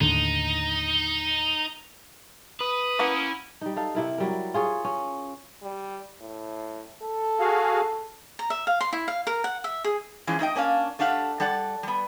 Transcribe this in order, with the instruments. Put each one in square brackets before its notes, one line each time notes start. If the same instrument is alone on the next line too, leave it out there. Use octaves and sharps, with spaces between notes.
[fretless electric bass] D#2 A2 D3 [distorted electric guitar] D#4
[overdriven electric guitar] B4 [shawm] D#6
[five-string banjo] A#3 B3 F#5 [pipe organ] C#4 E4
[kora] G3 D#4
D#4 A4 F5
C3 E4 A#4
F#3 G3 A#4
F4 G#4 C#5
C#4
[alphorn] G3
A2
A4
[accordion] F#4 G#4 F5
[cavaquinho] A#5
E5
F5
C6
E4
F5
A#4
F#5
E5
G#4
[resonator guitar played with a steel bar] E3 F3 G#3 C#4
A3 D#4 D#5 G5
A#3 C#4 D4 F5
A3 D4 G4 F5 F#5
G3 A4 D5 F#5
G3 B3